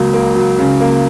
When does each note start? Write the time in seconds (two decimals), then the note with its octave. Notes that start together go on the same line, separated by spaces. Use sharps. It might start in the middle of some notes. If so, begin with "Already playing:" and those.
Already playing: C#2 F#3 A#3
0.13 A#3
0.35 F#3
0.59 C#3
0.80 A#3